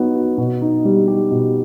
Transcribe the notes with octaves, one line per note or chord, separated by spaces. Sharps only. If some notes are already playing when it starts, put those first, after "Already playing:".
Already playing: F#3 B3 D#4 F#4
F#4
B2
D#4
G3
G4
B2